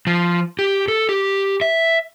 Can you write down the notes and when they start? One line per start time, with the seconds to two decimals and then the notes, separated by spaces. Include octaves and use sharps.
0.07 F3
0.59 G4
0.88 A4
1.09 G4
1.61 E5